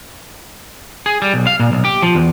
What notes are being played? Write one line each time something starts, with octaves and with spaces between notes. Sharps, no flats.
G#4
G3
B1
F5
A#2
B1
G4
F3
E2